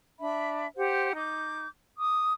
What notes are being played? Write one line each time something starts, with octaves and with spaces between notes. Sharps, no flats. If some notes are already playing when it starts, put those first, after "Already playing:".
D4 E5 B5
G4 C5 F#5
D#4 D6 G6
D6 D#6